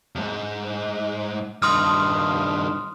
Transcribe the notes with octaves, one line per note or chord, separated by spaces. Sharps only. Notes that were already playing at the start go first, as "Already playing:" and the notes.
E2 G#2
G2 D#3 C6 D#6 F6